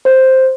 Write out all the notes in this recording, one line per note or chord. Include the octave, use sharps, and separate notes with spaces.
C5